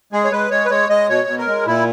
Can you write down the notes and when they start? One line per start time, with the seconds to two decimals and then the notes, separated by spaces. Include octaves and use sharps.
0.13 G#3 G#4
0.24 C#5
0.32 G#3 B4
0.51 G#3 C#5
0.66 B4
0.70 G#3 C#5
0.89 G#3 D#5
1.09 B2 C#5
1.28 B2
1.38 A#4
1.47 G#3
1.66 A#2 E4